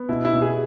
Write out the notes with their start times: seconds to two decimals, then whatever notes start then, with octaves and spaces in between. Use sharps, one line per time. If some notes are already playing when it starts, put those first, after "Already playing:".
Already playing: B3
0.09 B2 E4
0.25 E4
0.33 B2
0.42 G#4